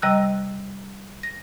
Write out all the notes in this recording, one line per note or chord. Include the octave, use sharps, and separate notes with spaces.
C3 G3 D#5 A#5 E6 F#6
A#6